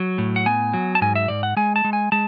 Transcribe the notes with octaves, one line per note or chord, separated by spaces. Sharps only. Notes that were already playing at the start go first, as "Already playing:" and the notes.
Already playing: F#3
A2
F#5
B3 G#5
F#3
A5
G#2 G#5
E5
G#2 D5
F#5
G#3 G#5
A5
G#3
G#5
G#3 A5